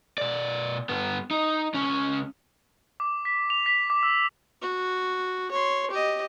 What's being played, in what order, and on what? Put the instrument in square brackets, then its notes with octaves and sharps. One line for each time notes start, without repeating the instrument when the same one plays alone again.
[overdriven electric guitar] B2 D5
G2 B3
D#4
C#2 C#4
[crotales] D6
B6
F7
B6
D6
E6
[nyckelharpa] F#4
C#5 C6
G4 D#5